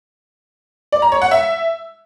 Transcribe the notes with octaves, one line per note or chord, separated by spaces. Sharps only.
D5
A#5
C#5
F#5
E5